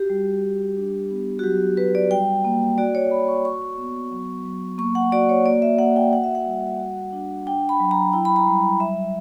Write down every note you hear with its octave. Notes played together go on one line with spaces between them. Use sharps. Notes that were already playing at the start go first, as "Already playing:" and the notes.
Already playing: F#4 G4
G3
G3
D4
B3
F#4
F#3 G4
F#4 B4
D5
G3 G5
A#3
F#4 D5
C#5
F#4 B5
C#6
F#4 C#6
B3
F#3
F#3
A#3 C#6
F#5
F#4 D5
C#5
A#3 D5
E5
A#3 F#5
G5
F#4 F#5
E5
F#5
G3
F#4
D4
D4 G5
B5
F#3
A#5
E4 G5
B5
A#5
G3
F#3 E5